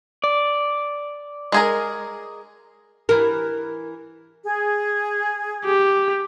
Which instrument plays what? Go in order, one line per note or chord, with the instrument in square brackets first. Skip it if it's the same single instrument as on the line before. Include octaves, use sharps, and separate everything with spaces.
[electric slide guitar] D5
[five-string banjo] G#3 G#4 A#4
[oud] E3 A#4
[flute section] G#4
[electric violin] G4